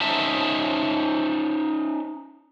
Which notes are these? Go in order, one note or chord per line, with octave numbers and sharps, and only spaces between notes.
C#4 D#4 C5 E5 A5